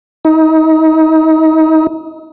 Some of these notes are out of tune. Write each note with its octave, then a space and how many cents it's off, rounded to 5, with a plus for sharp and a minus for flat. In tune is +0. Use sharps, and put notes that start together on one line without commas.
D#4 +30